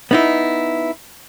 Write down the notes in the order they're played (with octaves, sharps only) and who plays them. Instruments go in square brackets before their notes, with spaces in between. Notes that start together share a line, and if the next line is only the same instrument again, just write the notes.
[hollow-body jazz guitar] B3 D#4 E4